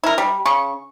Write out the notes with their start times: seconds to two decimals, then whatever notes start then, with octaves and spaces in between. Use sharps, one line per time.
0.04 E4 A#4
0.18 G3
0.45 C#3 C#6